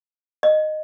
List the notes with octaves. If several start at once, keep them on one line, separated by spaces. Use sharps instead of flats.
D#5